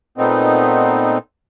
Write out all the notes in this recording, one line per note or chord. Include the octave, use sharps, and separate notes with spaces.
A#2 A3 B3 C4 D#4